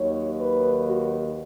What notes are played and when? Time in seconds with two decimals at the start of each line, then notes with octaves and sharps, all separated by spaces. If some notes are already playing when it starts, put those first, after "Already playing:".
Already playing: D#2 D#3 F#3 C#5
0.39 B4
0.86 F#4